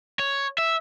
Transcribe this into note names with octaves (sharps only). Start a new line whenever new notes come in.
C#5
E5